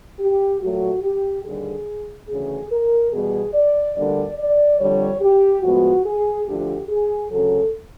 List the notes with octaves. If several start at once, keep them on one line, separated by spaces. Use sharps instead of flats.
G4
A#2 F#3 A3 F#4
G4
D#2 D3 G3 G#4
D2 C#3 E3 G#4
A#4
E2 B2 G3 B3 G#4
D5
D2 D3 G3 A#3 D5
D5
F2 D3 G3 C#5
G4
A2 F3 G#3 B3 F#4
G#4
D2 D3 F3 G4
G#4
D2 C#3 F#3 A4